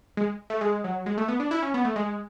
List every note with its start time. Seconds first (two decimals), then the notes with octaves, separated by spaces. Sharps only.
0.17 G#3
0.50 A3
0.61 G#3
0.84 F#3
1.06 G#3
1.18 A3
1.28 B3
1.40 D4
1.51 E4
1.62 C#4
1.74 B3
1.85 A3
1.96 G#3